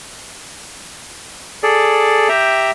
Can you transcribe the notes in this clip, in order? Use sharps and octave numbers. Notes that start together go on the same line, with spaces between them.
G#4 A4 D5
G4 E5 G5 A#5